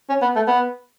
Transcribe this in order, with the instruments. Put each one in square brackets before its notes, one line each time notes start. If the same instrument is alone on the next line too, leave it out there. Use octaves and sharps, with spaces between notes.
[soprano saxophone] C#4
B3
A3
B3